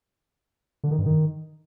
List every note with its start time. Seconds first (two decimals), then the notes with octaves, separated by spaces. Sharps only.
0.84 D3
0.91 D#3
0.99 G2
1.06 D#3